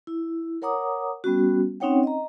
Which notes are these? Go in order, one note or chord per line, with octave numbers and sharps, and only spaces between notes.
E4
A#4 C#5 F#5 A#5 D6 D#6
G3 B3 C#4 F#4
C4 C#4 D#4 C#5 F#5 G5
D#5 A#5